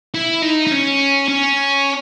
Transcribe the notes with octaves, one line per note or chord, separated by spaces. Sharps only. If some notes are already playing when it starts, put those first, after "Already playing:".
E4
D#4
D#4
C#4
C#4